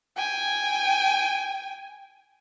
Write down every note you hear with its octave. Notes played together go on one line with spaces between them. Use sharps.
G5 G#5